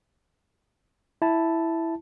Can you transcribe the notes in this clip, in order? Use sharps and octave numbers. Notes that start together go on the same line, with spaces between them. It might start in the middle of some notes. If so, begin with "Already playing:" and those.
E4 A5